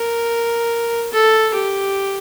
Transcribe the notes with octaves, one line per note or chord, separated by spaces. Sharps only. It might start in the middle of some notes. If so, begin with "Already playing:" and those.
Already playing: A#4
A4
G4